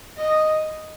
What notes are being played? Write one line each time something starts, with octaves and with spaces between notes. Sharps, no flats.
D#5